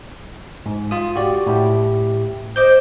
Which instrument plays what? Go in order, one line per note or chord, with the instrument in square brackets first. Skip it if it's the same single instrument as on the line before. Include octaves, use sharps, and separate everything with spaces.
[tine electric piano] G#2
F4 D#6
F#4 G4 D5
A2 E4 G4
[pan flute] C5 [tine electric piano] D#5 D6 G6